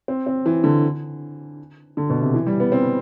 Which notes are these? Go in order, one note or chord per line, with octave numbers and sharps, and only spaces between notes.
C4
C4
E3
D3
D3
B2
C3
E3
G3
B3
C4